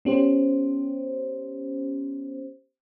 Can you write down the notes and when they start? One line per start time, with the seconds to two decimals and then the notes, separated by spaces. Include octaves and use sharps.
0.05 B3 C#4 G4 C5